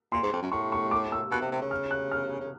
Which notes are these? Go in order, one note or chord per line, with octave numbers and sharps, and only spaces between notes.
A#2 C6
G#2
F2
F#2
A2 C#6
C#6
D6
E6
B2 F#6
C3
C3
C#3
F6
F#6
F6
C#3